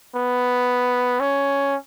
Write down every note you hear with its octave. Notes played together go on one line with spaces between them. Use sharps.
B3
C#4